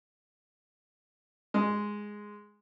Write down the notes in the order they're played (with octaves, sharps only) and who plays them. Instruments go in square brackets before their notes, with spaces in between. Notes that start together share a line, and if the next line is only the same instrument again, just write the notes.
[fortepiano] G#3